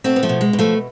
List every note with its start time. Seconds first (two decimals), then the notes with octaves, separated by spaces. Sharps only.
0.04 B2 A3 C4
0.16 B3
0.23 F3 A3
0.29 B2
0.41 G#3
0.53 B2
0.59 F3 A3